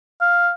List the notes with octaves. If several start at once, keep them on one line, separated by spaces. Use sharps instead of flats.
F5